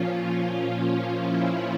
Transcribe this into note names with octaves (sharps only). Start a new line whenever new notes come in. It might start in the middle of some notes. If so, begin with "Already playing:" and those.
Already playing: A#2 F3 C#4 F4
F4
F4
E4